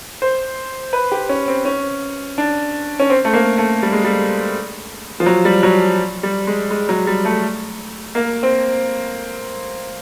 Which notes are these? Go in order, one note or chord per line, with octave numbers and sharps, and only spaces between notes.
C5
B4
G4
C#4
C4
C#4
D4
C#4
C4
A3
A#3
A3
G3
G#3
G3
F3
F#3
G3
F#3
G3
G#3
G#3
F#3
G3
A3
A#3
C4